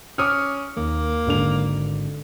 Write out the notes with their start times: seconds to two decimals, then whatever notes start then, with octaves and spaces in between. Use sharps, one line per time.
0.18 C#4 D6 D#6 F6
0.77 D#2 A#3
1.27 G#1 D3 F7